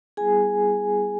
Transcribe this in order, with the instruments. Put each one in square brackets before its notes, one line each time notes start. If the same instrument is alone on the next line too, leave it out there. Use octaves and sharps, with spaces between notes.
[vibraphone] G3 B3 E4 G#4 G#5